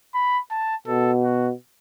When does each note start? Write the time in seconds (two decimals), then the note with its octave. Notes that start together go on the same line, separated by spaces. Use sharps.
0.14 B5
0.50 A5
0.87 B2 A4
1.23 F#4